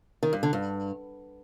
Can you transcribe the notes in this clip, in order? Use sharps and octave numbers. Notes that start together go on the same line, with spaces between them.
D#3
G2
D3
G2